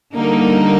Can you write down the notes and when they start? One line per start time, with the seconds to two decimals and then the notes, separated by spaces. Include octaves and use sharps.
0.14 D3 G3 A#3 D#4